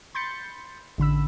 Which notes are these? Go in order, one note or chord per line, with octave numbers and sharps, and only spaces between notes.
B5 C6 G6 A6 C#7
A1 D3 B5 E6